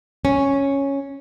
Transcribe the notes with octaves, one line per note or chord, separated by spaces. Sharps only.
C#4